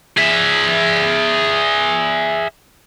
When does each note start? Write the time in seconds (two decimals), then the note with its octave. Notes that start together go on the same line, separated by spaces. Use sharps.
0.17 G#4 E5